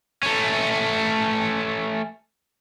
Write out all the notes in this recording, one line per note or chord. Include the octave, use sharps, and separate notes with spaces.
A3 C#4